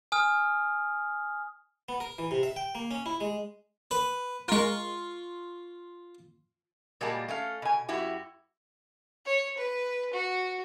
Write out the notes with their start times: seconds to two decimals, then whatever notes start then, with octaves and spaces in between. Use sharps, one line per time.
0.12 G#5 D#6 F6
1.89 B3
2.00 A#4
2.18 E3
2.31 C3
2.43 E5
2.56 G5
2.75 A#3
2.91 C#4
3.06 E4
3.20 G#3
3.91 B4
4.48 G#3 F4 A#4 C#6
7.01 A#2 G3 G#3 A#3 F#4 A5
7.28 A3 C#4 F5
7.62 B2 G#5
7.89 F#2 E4 F#4 G4
9.25 C#5
9.57 B4
10.14 F#4